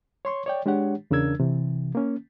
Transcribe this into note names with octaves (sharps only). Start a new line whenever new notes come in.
C#5 C6 C#6
C#5 D5 G5
G#3 D4 G4 C#5 F#5
E2 C#3 D4 A#4 E6 G#6
C3 E3
A#3 C#4